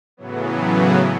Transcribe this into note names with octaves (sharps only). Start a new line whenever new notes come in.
A2 C#3 E3 F#3 B3